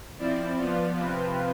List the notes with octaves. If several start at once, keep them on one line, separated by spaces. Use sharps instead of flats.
F3 C4 E4 D5
F3 B3 F4
C3 F3 C4 F4 B4